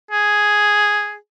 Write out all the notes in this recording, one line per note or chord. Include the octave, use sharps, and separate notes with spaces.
G#4